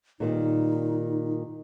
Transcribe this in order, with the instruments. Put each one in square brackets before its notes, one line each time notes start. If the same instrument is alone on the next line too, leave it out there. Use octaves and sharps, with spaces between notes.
[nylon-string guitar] A#2 D#3 G3 [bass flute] D#4